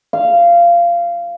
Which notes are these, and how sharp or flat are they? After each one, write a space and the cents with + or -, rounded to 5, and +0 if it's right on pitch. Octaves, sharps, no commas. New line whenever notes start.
F5 -20